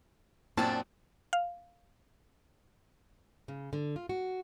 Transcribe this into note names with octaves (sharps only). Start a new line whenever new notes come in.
F#2 A#2 C4 D4 A4 A5
F5
C#3
D3
F4
F#4